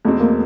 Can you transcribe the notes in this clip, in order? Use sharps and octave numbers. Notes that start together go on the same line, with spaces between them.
E2 B2 G#3 A3 C4
A#3